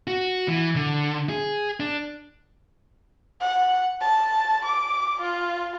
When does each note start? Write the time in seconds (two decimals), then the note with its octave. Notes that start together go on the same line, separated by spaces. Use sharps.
0.07 F#4
0.48 E3
0.76 D3
1.30 G#4
1.80 D4
3.41 F#5
4.01 A5
4.66 D6
5.22 F4